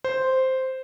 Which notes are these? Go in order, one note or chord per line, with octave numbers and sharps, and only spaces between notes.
C5